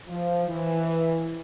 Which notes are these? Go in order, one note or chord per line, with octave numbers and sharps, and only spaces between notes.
F3
E3